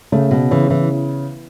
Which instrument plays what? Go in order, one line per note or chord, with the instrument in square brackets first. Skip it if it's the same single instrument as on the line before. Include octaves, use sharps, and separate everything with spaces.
[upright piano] C#3 [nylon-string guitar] A3
[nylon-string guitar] B2
[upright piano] C#3 [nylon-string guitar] E3
[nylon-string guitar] E3